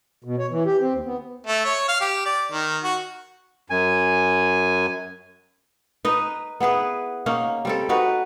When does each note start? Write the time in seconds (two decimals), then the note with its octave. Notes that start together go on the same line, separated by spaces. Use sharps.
0.24 B2
0.39 C#5
0.51 E3
0.66 G4
0.81 C4
0.93 D#2
1.06 B3
1.47 A3
1.65 C#5
1.88 F5
2.01 G4
2.26 D5
2.52 D#3
2.84 F#4
3.70 F#2 G#5
6.05 D#4 B4 D#5
6.60 B3 E4 G#4 B4
7.26 A#3 C#4 D#4
7.65 G3 C4 A4
7.89 D#4 F#4 B4